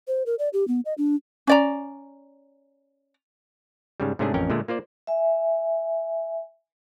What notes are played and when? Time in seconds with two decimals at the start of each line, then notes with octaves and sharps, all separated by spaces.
0.08 C5
0.26 A#4
0.39 D5
0.53 G4
0.68 B3
0.85 D#5
0.98 D4
1.47 C#4 D5 A#5
4.00 G#2 C#3 G3
4.19 G#2 C3 A3 C#4 D4 G#4
4.34 A1 F2 C#4 A#4 G5
4.50 A#2 D3 G#3 A3
4.68 A#3 F4 C5 D5
5.07 E5 G#5